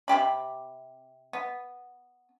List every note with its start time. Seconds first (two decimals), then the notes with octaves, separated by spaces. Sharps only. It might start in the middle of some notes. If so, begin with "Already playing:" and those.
0.08 C3 G#3 G4 B5
1.33 B3